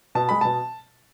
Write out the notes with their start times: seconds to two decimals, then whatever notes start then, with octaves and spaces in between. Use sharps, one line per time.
0.15 B2 A5
0.29 G#3 B5
0.41 B2 A5